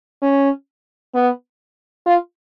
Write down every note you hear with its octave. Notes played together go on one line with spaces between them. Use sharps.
C#4
B3
F4